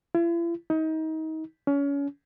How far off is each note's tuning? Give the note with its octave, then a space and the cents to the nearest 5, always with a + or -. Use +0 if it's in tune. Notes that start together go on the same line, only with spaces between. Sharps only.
E4 +45
D#4 +30
C#4 +30